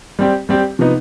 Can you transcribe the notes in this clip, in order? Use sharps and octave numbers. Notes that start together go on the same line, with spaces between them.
G3 C4 G4
G3 C4 G4
C3 F3 B3 D#4